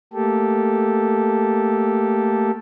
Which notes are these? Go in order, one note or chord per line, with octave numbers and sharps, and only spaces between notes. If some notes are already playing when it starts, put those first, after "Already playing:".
A3 A#3 G4 A4